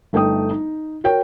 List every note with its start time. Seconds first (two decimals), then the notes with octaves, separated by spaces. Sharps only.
0.13 G1 A3 D#4 G5 D#6
0.51 D#4
1.04 F#4 A#4 C#5 G5